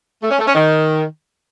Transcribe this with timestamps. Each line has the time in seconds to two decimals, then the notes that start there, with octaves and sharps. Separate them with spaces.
0.23 A3
0.31 C#4
0.39 A3
0.47 C#4
0.55 D#3